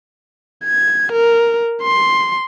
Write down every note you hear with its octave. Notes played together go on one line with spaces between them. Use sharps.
G#6
A#4
C6